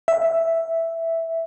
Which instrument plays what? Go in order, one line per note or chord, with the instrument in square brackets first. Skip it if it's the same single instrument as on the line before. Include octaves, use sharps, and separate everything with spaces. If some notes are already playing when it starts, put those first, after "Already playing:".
[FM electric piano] E5